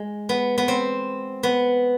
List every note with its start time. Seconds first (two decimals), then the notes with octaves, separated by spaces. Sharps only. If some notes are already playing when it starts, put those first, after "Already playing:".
Already playing: G#3
0.29 B3
0.58 B3
0.68 C4
1.43 B3